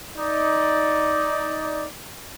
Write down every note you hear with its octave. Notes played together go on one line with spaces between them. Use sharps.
D#4 D5